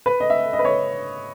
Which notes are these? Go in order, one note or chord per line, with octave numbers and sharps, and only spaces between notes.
B4
D#5
E5
D#5
B4
C#5